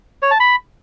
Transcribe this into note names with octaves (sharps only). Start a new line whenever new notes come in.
C#5
A5
B5